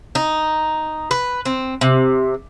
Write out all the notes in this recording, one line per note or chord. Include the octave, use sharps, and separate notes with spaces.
D#4
B4
C4
C3